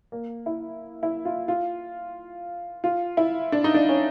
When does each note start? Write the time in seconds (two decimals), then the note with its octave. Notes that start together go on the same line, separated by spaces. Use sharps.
0.12 A#3
0.46 E4
1.03 E4
1.25 F4
1.48 F4
2.84 F4
3.17 E4
3.52 D4
3.64 D#4
3.74 D4
3.89 C#4